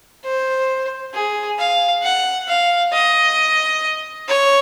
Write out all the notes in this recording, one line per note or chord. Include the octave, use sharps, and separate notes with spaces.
C5
G#4
F5
F#5
F5
D#5
C#5